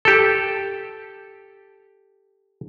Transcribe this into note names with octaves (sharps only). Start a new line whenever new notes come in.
G4 A4